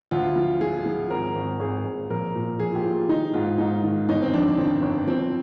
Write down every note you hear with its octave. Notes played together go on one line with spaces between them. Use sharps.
D2 F4
F3
F3 G#4
F3
G#1 A#4
G#1
G#1 G#4
G#1
A#1 A#4
A#2
A#1 G#4
F4
G4
F3
F4
D#3 D#4
G#2 F4
G#2 D#4
D#3
G1 D#4
C4
F2 D4
D#3 C4
G1
F3 C4